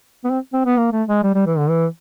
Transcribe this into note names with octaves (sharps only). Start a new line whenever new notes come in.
B3
C4
C4
B3
A#3
A3
G#3
G3
G3
E3
D3
E3